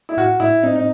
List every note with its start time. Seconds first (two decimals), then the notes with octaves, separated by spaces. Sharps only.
0.09 E4
0.17 A2 F#4
0.40 A2 E4
0.63 C4 D#4
0.76 D#4